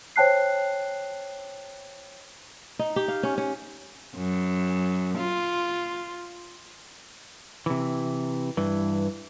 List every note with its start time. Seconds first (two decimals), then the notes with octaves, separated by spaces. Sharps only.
0.16 C5 C#5 G5 A5 F#6 C7
2.79 D#4
2.96 G4
3.08 F5
3.23 C#4
3.38 C#4
4.16 F#2
5.18 F4
7.66 C3 E3
8.57 G2 E3